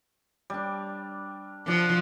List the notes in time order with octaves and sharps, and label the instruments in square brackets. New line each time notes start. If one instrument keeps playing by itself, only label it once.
[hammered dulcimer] G3 D4
[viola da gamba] F3 [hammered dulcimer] D4 F#5